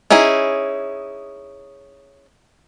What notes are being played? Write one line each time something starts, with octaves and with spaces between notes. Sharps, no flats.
C#4 D#4 E4 G#4